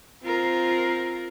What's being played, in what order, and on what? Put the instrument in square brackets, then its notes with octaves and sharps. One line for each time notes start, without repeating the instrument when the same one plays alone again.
[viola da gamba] C4 F4 A#4